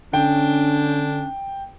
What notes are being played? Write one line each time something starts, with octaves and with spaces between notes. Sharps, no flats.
D3 C#4 D4 G5